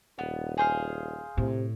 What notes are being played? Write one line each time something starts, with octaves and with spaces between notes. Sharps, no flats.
D#1 B3
G#4 C5 F5
A2 C3